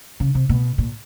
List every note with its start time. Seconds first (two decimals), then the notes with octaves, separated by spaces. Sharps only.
0.20 C#3
0.35 C3
0.49 B2
0.78 A#2